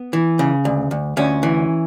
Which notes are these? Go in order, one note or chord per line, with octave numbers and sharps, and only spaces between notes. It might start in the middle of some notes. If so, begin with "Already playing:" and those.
Already playing: B3
E3
C#3
D2
D2
D2 C#4
E3